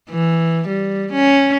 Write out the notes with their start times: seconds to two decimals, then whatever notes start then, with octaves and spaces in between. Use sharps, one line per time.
0.10 E3
0.68 G3
1.13 C#4